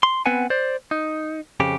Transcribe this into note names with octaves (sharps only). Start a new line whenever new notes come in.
C6
B3 C4 B4 F#5 G#5
C5 D5
D#4
F2 C#3 G4